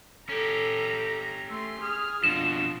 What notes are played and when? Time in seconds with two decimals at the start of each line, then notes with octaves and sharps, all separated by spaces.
0.29 C#4 G4 A4 A#5
1.49 A3 C6 E6
1.82 G#4 D#6 F6
2.24 F2 B2 D4 F4 E7